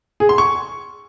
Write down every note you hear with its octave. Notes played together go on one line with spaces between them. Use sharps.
G#4
C6
C#6